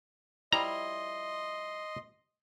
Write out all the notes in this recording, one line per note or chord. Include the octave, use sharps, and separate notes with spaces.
F3 G3 E4 D#5 A#5 C6